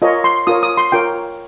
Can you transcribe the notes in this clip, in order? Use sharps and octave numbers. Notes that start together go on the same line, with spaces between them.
F4 A#4 C#5 D#5
C6
F4 A#4 C#5 D#6
D#6
C6
F4 A#4 C#5 G5